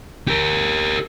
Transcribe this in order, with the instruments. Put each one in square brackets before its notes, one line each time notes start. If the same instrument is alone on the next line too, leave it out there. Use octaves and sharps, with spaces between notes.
[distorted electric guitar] G4 A#4